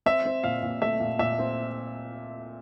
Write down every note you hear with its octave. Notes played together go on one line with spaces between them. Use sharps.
C4 E5
C4
A#2 F5
A#2
A3 E5
A#2
A#2 E5
C4